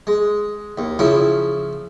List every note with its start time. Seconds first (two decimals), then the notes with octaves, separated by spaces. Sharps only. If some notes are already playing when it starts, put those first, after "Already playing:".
0.07 G#3
0.78 D#2
0.99 C#3 F3 E4